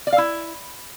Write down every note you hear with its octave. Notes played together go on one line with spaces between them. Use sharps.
D5
F5
E4